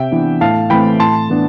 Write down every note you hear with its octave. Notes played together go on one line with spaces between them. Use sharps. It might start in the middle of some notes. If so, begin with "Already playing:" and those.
Already playing: C3 E5 G5
E3 B3 D4
A2 F5 A5
E3 A3 C4 G5 B5
A2 A5 C6
E3 B3 D4